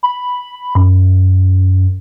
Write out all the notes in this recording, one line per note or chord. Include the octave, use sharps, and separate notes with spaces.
B5
F#2